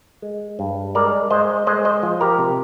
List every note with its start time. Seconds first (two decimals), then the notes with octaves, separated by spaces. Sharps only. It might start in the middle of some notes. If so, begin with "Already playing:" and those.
0.22 G#3
0.59 G2
0.95 G#3 A#4 D5
1.31 G#3 C5 D#5
1.67 G#3 C5 D#5
1.85 C5 D#5
2.03 F3
2.21 G4 A#4
2.39 C3